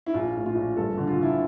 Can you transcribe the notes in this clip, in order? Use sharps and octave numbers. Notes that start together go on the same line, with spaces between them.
E4
A#1 F4
A2
F4
A#1
G1 A4
D3
F4
D3 E4